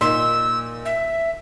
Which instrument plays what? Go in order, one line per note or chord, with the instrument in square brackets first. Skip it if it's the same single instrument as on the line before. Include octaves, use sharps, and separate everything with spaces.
[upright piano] A#2 D#4 C6 [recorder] E6
[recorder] E5